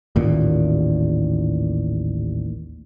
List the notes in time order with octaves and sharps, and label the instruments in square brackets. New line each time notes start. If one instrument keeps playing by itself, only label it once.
[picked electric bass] A1 D#2 A#2